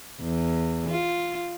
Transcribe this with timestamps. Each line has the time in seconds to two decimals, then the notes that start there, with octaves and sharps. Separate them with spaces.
0.22 E2
0.89 F4